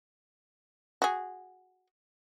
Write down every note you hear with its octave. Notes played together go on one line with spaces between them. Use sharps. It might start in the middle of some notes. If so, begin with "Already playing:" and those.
F#4 G#4